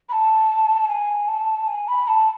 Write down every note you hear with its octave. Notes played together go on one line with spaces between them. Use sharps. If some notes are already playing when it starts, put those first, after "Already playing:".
B5
A5
G#5
A5
G#5
B5
A5